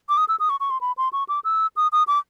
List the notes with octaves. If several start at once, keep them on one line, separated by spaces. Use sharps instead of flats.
D6
D#6
E6
D#6
C#6
C#6
C6
B5
C6
C#6
D6
E6
D#6
D#6
D6